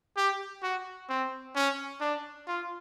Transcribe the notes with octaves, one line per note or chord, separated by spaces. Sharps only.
G4
F#4
C4
C#4
D4
F4